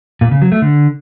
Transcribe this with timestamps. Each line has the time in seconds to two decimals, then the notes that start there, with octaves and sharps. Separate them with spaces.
0.21 A#2
0.31 C#3
0.42 F#3
0.52 A3
0.62 D3